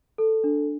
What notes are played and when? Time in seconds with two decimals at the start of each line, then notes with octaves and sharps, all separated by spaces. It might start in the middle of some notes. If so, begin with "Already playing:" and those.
0.18 A4
0.44 D4